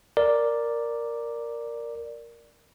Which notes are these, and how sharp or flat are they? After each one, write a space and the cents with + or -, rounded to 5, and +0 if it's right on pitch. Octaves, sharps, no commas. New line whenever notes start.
A#4 +0 D5 +0